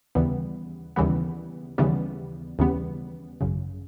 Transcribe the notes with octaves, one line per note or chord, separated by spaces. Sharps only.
D#2 C#3 E3 G3 B3
D#2 C#3 E3 G3 B3
D#2 C#3 E3 G3 B3
D#2 C#3 E3 G3 B3
G#1 F#2 C#3